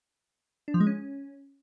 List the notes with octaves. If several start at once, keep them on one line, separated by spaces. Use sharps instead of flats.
D4
F3
G#3
C#4